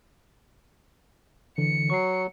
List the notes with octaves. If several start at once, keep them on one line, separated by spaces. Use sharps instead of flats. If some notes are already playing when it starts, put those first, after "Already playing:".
D3 E3 C#7
F#3 C#6 C7